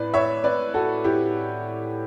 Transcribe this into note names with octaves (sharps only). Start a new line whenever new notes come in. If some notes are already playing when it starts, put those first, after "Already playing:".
Already playing: A2 B4 D5
C#5 E5
B4 D5
F#4 A4
E4 G4